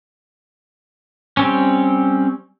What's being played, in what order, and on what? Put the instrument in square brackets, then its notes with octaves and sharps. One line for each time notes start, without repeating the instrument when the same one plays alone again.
[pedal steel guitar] G3 C4 C#4